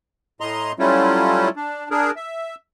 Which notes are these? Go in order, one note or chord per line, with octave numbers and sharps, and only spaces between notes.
A2 D#5 A#5 C6
F#3 G3 A3 C#4 E4 F4
D4
D4 G#4 A#4
E5